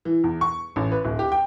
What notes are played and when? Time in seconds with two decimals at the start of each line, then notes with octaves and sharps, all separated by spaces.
0.05 E3
0.24 E2
0.41 C#6
0.76 A1
0.92 B4
1.05 D1
1.19 G4
1.32 G5